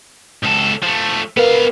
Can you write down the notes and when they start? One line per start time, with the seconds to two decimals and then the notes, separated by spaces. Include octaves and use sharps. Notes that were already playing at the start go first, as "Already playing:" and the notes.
0.44 C#2 A4
0.83 F3 A3
1.37 B3 A#4 B4 F5